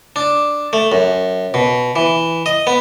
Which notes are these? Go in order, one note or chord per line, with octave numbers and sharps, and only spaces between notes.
D4
A3
F#2
B2
E3
D#5
B3